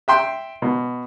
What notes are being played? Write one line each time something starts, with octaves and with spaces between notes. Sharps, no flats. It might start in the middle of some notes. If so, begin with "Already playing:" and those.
E5 G5 C6
B2